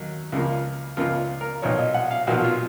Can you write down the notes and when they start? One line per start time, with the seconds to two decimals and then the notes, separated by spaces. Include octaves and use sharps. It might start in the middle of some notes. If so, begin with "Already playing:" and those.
Already playing: D#2 F#3
0.32 C#2 C#3 F3 A#3
0.97 C#2 C#3 F3 A#3 F4
1.41 A#4
1.62 B1 A#2 F3 C#5
1.79 D#5
1.94 F#5
2.11 F5
2.27 B1 A#2 F3 F#4
2.44 F4